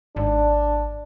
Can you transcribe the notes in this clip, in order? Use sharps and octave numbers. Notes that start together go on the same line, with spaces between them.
G#1 D4